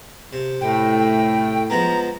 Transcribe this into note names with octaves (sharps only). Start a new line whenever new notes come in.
C3
A2 G5
F3 G#3 B3 A#5